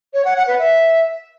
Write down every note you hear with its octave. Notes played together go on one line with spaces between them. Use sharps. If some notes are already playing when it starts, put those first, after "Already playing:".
C#5
F#5
F#5
B4
E5